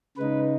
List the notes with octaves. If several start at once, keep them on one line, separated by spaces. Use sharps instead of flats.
C#3 G#3 D#4 B4